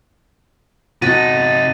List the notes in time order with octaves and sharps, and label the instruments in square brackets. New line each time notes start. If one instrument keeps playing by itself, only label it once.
[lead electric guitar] C3 D#4 [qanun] F#4 [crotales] A6 D#7